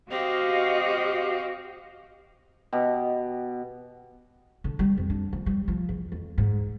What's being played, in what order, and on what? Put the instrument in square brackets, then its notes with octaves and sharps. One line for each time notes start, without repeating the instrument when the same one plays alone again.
[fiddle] C4 [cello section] F#4 D#5 F5 [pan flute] G4
[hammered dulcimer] B2 G4 C#6
[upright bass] D3
G3
F2
D4
F3
G3
F3
E2
F2
G#2